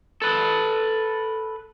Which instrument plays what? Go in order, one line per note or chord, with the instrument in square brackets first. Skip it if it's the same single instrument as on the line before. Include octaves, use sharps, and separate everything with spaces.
[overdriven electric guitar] A4 B4